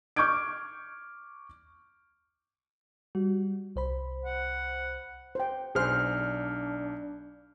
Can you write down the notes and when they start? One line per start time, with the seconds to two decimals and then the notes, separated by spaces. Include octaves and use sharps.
0.16 C#6 D6 F6 G6 G#6 D7
3.15 G3 F#4
3.76 C2 C5 B5
4.25 F#5
5.35 C5 G5
5.75 B1 D4 G#4 C5 C6 F6